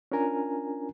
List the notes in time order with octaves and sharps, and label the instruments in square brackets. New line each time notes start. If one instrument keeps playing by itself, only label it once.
[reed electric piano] C#4 D4 F4 A#4 G#5 A#5